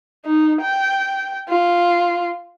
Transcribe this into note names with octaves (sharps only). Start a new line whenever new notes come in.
D#4
G5
F4